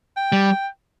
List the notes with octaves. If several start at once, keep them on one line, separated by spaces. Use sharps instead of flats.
G5
G3